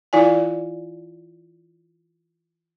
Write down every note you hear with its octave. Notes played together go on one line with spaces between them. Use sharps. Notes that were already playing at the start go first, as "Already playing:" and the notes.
E3 E4 F4 D5 F5 G#5